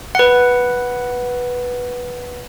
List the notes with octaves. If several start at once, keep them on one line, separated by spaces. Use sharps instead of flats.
B4 F#5